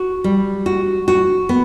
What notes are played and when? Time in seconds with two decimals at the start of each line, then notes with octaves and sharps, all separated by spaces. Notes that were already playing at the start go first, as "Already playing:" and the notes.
Already playing: F#4
0.24 G3
0.66 F#4
1.08 F#4
1.49 B3